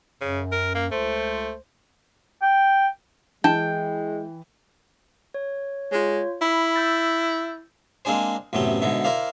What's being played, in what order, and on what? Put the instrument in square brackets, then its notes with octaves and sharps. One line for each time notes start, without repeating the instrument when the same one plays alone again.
[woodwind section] F#2 [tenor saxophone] C#3
[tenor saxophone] A#4
A#3
[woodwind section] C#2 C5 [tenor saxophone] A3
[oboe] G5
[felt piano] E3 [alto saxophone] G#3 [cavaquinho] G5 [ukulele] A5
[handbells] C#5
[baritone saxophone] G#3 [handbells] F4 C#5
[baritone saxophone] E4 [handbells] B5
[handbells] E6 G6 A6
[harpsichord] G#3 A#3 C4 D4 G#4 C5
A1 F#2 C3 A3 B3 G5
G#2 B2 D3 B3 E4
E4 A#4 C5 D5 F5